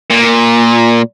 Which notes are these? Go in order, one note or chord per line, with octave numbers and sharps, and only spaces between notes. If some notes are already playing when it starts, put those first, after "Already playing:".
A#2